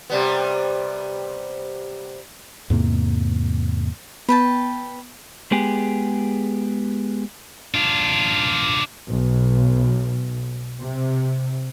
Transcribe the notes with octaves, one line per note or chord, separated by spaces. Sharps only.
C3 G3 B3
E2 G#2 C3 A#3
B3 B4 G5 A5
G#3 B3 G4 G#4
D4 F4
B1
C3